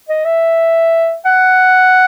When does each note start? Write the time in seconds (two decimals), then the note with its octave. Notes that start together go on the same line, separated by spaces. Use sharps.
0.09 D#5
0.25 E5
1.25 F#5